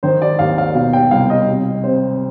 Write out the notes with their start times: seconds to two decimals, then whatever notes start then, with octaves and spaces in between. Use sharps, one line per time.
0.03 D#3 C5
0.22 D5
0.39 D#2 F5
0.58 F5
0.75 B2 F5
0.93 G5
1.11 C2 F5
1.30 D#5
1.48 C3
1.83 C3 C5